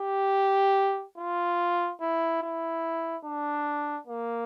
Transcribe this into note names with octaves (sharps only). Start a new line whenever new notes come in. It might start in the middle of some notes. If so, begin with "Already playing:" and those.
Already playing: G4
F4
E4
E4
D4
A#3